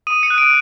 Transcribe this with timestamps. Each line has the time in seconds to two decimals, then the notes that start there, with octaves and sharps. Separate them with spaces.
0.07 D#6 D#7
0.23 C#7
0.30 F#6
0.38 D7